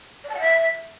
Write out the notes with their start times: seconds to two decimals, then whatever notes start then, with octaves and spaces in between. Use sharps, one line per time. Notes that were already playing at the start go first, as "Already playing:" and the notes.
0.24 D5
0.29 A5
0.35 F#5
0.40 E5